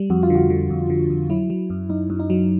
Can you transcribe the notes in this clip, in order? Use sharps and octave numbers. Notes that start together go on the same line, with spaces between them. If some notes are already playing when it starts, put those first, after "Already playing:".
Already playing: G3
F2 F#4
F4
D3
F#4
D3
F2
D3
F2
F#3 E4
F#3
F#2
F#2 D#4
F#2
D#4
F#3